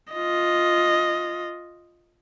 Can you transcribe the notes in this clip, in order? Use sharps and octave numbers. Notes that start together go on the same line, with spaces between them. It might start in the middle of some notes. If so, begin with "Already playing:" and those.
F4 D#5